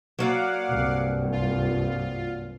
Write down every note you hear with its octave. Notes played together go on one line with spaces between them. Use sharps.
F#3 A#3 D5 F5 F#5 D6
C2 G2
F4